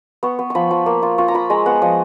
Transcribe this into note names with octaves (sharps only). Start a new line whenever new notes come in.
B3 C#6
B3
F3 B5 C#6
F3
A#3
F4
F4 C#6
A#5
F4 B5
G#3 A#5
B3 F#5
F3 D#5